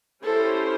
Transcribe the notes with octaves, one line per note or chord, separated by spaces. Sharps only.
C#4 E4 G4 A4 C5